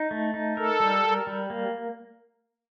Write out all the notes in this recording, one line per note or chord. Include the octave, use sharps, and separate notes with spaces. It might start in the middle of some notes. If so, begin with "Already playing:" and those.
Already playing: D#4
A3
D#4
A4 A#4
G3
A#4
G3
A#3